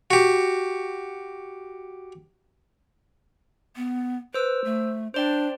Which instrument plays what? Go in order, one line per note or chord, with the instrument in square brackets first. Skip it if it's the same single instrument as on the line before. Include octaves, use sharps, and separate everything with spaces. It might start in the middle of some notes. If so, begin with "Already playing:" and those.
[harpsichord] F#4 G4
[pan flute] B3
[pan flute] B4 [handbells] C5 E6
[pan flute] A3
[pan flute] D4 [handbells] C5 D5 G5